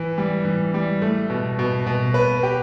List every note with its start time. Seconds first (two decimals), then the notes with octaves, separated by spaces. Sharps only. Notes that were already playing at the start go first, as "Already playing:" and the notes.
Already playing: E3
0.18 G3
0.45 E3
0.74 G3
1.02 A3
1.30 B2
1.59 B2
1.87 B2
2.14 B4
2.43 G4